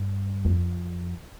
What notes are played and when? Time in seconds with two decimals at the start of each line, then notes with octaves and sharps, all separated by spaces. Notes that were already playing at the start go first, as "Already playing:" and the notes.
Already playing: G2
0.45 F2